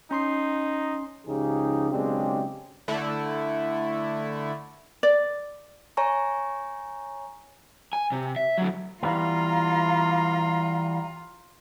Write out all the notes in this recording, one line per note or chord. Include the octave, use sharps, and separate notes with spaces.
C#4 D#4 C6 C7
C#2 C#3 F3 D#4 G4 G#4
B1 C#3 G#3 C4 D4 G4
D3 A3 E4
D5
C#5 G#5 A#5 C#6
G#5
C3
E5
D3 F#3
E3 G3 B3 F4 F5 A#5